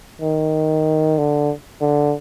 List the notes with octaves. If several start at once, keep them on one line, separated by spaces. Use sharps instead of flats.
D#3
D3
D3